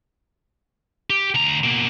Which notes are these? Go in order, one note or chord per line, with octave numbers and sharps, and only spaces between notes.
G4
D2 A#5
B2 A#3